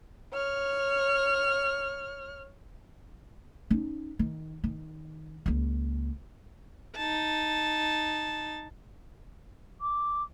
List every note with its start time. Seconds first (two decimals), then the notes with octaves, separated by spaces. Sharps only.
0.33 C#5 F6
3.71 C#4 D#4
4.19 D#3
4.64 D#3
5.46 C#2 A#3
6.97 D#4 A5
9.81 D6